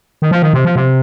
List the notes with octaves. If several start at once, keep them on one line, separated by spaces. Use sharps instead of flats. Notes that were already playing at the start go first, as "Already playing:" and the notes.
D#3
F3
D#3
C3
F3
C3